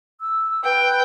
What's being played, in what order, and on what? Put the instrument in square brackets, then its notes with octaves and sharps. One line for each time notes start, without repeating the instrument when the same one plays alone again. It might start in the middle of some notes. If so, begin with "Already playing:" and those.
[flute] E6
[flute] B4 [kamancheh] G5